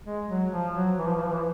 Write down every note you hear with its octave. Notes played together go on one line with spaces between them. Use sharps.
G#3
F#3
F3
F#3
E3
F3
E3
F3
E3